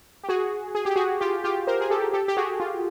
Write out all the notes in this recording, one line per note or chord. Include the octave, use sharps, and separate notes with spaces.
G4
F#4 G#4
G#4
G4
F#4 G#4
F4 G4
F4 G4
A#4 C5
G#4
G4 A4
G4 A4
G4
F#4 G#4
F4